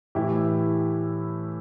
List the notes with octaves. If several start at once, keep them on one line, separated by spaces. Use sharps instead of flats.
A2 E3 E4 G4